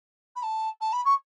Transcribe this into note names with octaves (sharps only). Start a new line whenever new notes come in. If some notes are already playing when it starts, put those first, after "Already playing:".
B5
A5
A5
B5
C#6